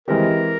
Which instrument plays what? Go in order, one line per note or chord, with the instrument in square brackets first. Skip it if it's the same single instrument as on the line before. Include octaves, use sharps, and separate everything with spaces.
[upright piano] E3 G#3 C4 G4 [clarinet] A#4